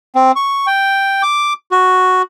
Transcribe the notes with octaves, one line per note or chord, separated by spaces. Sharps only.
C4
C#6
G5
D6
F#4